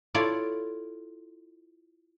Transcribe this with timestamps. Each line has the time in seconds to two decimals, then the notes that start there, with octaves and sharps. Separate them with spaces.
0.14 E4 F4 A4 C#5 D5